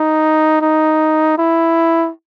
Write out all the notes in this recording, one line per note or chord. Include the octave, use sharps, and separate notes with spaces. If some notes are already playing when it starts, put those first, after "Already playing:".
Already playing: D#4
D#4
E4